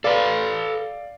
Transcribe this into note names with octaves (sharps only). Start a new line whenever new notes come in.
A4 B4 D5 F5